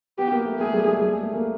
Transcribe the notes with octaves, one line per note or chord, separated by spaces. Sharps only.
B3 G4
A#3
A3
A3 G#4
G3
G#3
G3
A3
A#3